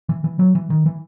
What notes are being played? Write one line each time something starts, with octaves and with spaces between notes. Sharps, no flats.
E3
E3
F#3
E3
D#3
E3